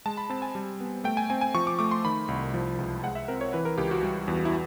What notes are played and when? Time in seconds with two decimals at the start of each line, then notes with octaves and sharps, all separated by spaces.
0.06 G#3 A5
0.17 B5
0.30 C4 A5
0.42 G#5
0.55 G3
0.80 B3
1.04 A3 G5
1.17 G#5
1.30 C4 G#5
1.41 G#5
1.54 F3 C#6
1.67 D6
1.79 A3 D6
1.91 C6
2.05 D#3 B5
2.28 C2
2.54 F3
2.79 C#2
3.03 G#3 F#5
3.15 E5
3.28 C4 A#4
3.41 C#5
3.53 E3 B4
3.65 A#4
3.78 C#2 G4
3.91 F#4
4.03 G3
4.28 E2
4.45 E4